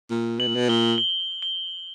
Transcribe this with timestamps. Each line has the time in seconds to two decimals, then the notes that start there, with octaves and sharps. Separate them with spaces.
0.10 A#2
0.39 B2 F#7
0.48 A#2
0.56 B2
0.69 A#2 G7
0.98 G7
1.42 G7